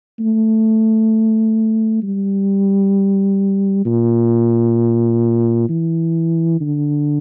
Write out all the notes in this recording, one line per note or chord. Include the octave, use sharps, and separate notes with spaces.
A3
G3
A#2
E3
D3